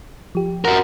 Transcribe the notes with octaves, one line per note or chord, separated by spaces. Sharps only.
F3 G4
F#4 A#4 F#5